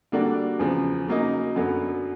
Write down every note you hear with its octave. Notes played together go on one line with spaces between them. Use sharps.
D3 G3 A#3 D4 F#4
E2 C#3 F3
C#3 F#3 A#3 D#4
F#2 D3 F#3 B3